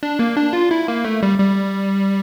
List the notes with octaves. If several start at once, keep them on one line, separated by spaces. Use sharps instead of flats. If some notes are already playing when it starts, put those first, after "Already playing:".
D4
A#3
D4
F4
E4
A#3
A3
G3
G3